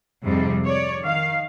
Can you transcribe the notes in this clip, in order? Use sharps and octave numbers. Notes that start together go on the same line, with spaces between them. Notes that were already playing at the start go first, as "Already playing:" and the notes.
F2 G#2 C3 G3
C#5 D5
D#3 F5